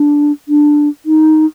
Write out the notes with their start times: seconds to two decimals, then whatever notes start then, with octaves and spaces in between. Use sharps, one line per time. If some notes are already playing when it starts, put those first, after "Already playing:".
Already playing: D4
0.49 D4
1.06 D#4